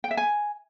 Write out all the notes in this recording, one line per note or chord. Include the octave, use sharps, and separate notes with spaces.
G5
E5
G#5